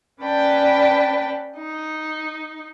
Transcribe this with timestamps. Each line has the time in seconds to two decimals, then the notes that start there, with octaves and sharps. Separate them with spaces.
0.22 C#4 B4 D5 G5 A5
1.58 D#4